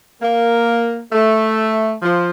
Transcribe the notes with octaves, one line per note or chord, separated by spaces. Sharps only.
A#3
A3
F3